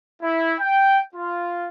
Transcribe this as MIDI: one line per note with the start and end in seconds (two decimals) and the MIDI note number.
0.22 0.54 64
0.59 0.98 79
1.15 1.68 65